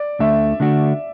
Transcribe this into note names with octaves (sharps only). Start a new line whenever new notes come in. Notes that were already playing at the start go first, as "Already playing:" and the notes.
Already playing: D5
D2 D3 A3 E5
D3 A3 D4 F#4